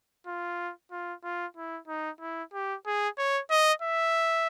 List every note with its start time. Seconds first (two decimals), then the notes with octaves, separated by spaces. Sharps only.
0.27 F4
0.91 F4
1.24 F4
1.56 E4
1.88 D#4
2.21 E4
2.53 G4
2.86 G#4
3.18 C#5
3.50 D#5
3.82 E5